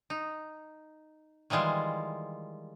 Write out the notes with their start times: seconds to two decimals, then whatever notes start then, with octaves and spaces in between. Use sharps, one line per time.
0.10 D#4
1.50 D#3 E3 G3 G#3 F4